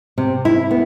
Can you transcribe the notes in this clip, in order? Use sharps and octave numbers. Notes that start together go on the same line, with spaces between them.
C3
E4
B3